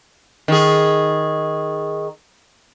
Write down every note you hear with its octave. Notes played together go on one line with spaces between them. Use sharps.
D#3 G#4